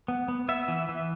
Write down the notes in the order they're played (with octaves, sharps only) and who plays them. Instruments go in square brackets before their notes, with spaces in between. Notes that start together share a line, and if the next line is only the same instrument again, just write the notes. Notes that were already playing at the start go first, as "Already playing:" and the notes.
[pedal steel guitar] B3
B3
B3 E5
E3
E3